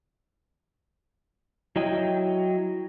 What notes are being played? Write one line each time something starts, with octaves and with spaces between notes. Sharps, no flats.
F#3 E4 D#5 G5